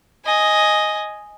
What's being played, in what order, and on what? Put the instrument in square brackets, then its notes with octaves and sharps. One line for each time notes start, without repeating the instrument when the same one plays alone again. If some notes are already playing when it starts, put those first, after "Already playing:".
[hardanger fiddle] D#5 G#5